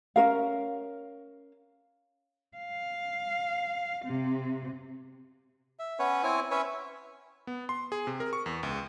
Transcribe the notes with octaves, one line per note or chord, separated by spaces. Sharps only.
C#4 A#4 F5
F5
C3
E5
B3 C#4 B4 C#5
C4 E4 C#5 G#5
C#4 B4 C#5 E5
B3
C6
G#4
C3
A#4
C#6
E2
C#2